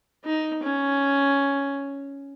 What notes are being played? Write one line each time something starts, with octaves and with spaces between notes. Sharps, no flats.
D#4
C#4